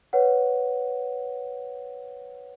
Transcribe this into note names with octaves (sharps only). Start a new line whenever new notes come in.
B4 C#5 F#5